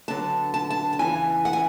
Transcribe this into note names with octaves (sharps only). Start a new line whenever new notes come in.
D3 F#3 B3 D4 A5
A5
A5
A5
E2 C#3 E3 B3 G#5
F#5
G#5